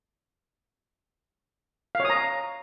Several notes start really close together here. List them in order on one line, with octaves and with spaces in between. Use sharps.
F5 C#5 D#6 A#5